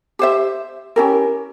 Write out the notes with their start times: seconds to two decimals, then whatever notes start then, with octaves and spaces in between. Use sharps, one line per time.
0.19 G4 C5 E5
0.96 C#4 E4 G4 A#4